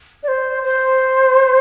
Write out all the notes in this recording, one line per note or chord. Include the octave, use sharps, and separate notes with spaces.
D5
C5
C5